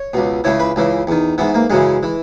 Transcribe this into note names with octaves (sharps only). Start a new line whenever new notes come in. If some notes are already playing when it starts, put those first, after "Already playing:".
Already playing: C#5
C#2 B2
C#2 C#3 E3 C#5
B4
C#2 C#3 E3
E2 D#3
G#2 E3 B3
A#3
F#2 C#3 E3 G#3
E3